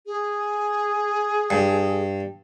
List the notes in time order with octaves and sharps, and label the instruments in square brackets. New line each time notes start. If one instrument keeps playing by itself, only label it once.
[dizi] G#4
[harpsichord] G2